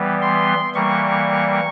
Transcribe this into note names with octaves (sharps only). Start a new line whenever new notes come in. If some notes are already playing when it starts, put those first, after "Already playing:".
Already playing: E3 G3 B3
C6
E3 G3 A#3 C#6